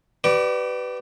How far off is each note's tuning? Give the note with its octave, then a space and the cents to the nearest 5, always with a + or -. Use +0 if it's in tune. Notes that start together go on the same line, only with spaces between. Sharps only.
G4 -40 B4 +10 D5 +15